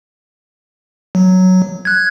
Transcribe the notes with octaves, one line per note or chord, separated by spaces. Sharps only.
F#3
F#6 G#6